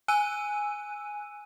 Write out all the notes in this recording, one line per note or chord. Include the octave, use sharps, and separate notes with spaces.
G#5 E6 F#6 D#7